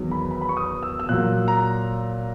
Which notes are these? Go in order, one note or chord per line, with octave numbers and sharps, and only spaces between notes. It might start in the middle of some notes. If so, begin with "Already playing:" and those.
Already playing: E2 D#3 F#3
B5
B5
B5
C#6
D#6
E6
E6
A#2 F#3 F#6
A#5